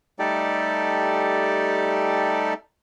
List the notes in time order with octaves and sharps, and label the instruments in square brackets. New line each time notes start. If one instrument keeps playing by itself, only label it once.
[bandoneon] G3 A3 D#4 G4 A4 D5